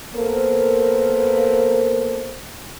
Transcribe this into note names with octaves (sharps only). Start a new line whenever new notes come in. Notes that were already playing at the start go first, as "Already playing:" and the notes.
A#3 B3 A4 A#4 C5